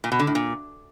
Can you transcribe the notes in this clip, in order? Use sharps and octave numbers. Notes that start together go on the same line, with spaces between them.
A#2
B2
D3
A2
A#2